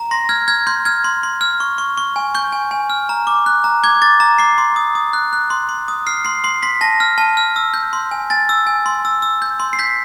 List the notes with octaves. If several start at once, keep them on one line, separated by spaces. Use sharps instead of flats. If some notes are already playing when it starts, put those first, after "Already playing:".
Already playing: A#5
C6 A#6
F6 G#6
F6 G#6
C6 G6
F6 G#6
C6
C6
F6
C#6
C#6
C#6
G#5
C#6 G6
G#5
G#5
F6
A#5
D6
F#6
A#5
D6 G#6
D6 A6
A#5
D6 C7
C6
D#6
D#6
F#6
F#6
C6
C6
D#6
F6 C7
C6 C7
C6 C7
C6 B6
A5 A#6
F6
A5
F6
E6
G6
C6
G#5
G#5 A6
E6
G#5
C6
E6
E6
G6
C6
C7
G6 B6